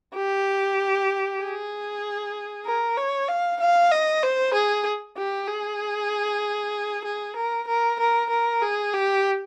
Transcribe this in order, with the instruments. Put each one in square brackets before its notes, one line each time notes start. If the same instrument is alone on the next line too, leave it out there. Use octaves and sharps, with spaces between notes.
[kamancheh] G4
G#4
A#4
C#5
F5
F5
D#5
C5
G#4
G4
G#4
G#4
A#4
A#4
A#4
A#4
G#4
G4